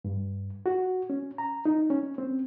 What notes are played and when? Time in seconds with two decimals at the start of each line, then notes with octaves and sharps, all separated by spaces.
0.05 G2
0.66 F#4
1.10 C#4
1.38 A#5
1.65 D#4
1.90 C#4
2.18 C4